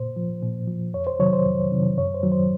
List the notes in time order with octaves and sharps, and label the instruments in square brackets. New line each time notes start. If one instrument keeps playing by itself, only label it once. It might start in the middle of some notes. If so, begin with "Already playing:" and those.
Already playing: [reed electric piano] A#2 C5
F3
A#2
F3
F2 C#5
C5
C3 D#3 F#3 C#5
C5
F2
C3 D#3 F#3
F#2 C#5
C5
D#3 F#3
C5